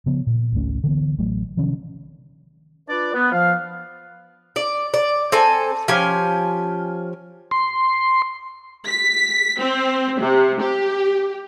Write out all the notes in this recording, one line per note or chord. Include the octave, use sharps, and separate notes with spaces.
C#3 F3 B3
A#2
G#1 C#2 A3 C#4
D3 E3 A#3 B3
A1 F#3 A3
C3 D#3 F3 C#4
D4 F4 B4 D5
B3
F3 F5
D5
D5
C4 A4 G#5
F3 C#4 G4 G#5
C6
B6
C4
C3
G4